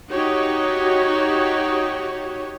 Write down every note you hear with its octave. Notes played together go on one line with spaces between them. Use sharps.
D#4 F#4 G4 C#5